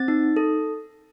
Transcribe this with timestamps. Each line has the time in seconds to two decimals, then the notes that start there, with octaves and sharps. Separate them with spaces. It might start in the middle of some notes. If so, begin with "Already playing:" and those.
Already playing: C4 A6
0.08 D#4
0.36 A4